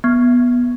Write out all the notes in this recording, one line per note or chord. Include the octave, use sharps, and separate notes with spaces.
B3